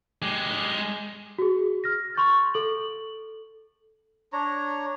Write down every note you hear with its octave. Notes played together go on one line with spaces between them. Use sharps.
G#3 G4
F#4 G#4
F6 A#6
C6 C#6 G6 A6
A4 F#7
D4 C#5 A#5